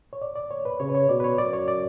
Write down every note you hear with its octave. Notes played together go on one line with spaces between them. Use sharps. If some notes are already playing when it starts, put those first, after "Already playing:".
C#5
D5
D5
C#5
B4
C#3 C#5
B4
C#5
B2 D5
B4
C#5
F#2 D5
C#5
D5